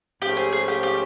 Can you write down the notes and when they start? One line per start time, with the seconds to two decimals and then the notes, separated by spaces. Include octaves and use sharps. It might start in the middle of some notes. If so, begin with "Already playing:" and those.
0.22 G#2 F3 A3 C#4 G4
0.37 G#4
0.52 G#4
0.68 G4
0.83 G4